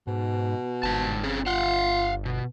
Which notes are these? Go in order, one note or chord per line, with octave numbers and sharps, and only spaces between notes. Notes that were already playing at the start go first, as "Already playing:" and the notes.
G#2 B2
G1 G#2 A5
C4 C#4 G#4
F4 F5 F#5
B2